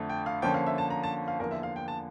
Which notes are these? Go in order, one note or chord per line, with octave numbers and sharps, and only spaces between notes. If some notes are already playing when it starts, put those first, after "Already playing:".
Already playing: F2 D3 A3
G5
F5
D3 F3 A#3 C#4 G5
F5
E5
A5
A#5
A5
F5
E2 D3 F3 A#3 A#4
E5
F5
G5
A5